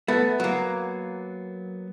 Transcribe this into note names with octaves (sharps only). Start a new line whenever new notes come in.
A3 B3 A6
F#3 A#3